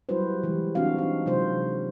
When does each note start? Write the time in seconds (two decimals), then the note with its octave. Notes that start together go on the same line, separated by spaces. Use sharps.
0.09 F#3 G3 E4 F#4 B4 C5
0.43 E3 G#3 G4
0.75 C4 D4 F#4 F5
0.98 D4 D#4
1.26 C3 F#3 G#3 F4 C5